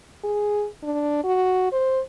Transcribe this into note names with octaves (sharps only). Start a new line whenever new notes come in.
G#4
D4
F#4
C5